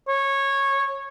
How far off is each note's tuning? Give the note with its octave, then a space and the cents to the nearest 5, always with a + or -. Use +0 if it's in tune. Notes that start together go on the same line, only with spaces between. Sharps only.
C#5 -15